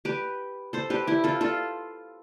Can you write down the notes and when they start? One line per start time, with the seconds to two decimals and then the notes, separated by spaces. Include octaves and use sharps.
0.05 G4 B4
0.73 A4 C5
0.90 G4 B4
1.07 E4 G4
1.24 F4 A4
1.41 F4 A4